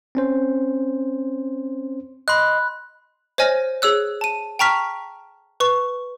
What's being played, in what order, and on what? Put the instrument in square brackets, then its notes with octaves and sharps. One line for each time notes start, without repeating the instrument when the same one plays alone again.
[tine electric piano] C4 C#4 C5
[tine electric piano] D#5 C6 [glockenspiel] B5 F#6
[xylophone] C5 C#5 D#5 G#5 F6 A#6
G#4 C#5 E6 F#6
A5 D#7
G5 A5 A#5 C#6 F6 B6
B4 C#6